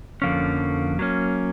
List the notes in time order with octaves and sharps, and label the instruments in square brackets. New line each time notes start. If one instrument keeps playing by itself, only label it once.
[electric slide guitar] F2 D3 F3 A#3 C#4
F#3 A#3 C#4